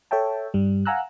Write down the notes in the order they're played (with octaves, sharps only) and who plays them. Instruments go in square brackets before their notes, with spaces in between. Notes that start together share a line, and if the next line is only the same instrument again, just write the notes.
[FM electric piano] A4 C#5 E5 G5 A5
G2 G3
F5 F#5 G#5 A#5 E6 F#6